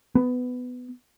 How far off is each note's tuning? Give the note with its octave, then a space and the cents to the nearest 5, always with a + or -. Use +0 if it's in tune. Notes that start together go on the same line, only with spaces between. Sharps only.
B3 +15